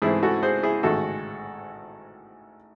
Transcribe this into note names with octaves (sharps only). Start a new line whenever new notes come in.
G#2 E3 A3 C4 E4 G#4
F#4 A4
G#4 C5
E4 G#4
A1 G#2 D#3 G#3 F#4 A4